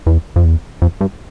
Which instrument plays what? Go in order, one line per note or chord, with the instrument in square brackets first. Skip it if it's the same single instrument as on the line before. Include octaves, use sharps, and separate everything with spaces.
[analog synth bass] E2
F2
E2
F2
G2